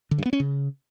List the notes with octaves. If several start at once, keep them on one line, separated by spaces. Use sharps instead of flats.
D3
G2
B3
C#4
C#3